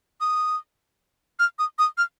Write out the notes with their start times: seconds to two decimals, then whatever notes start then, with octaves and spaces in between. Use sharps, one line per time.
0.21 D#6
1.39 F6
1.59 D#6
1.79 D#6
1.98 F6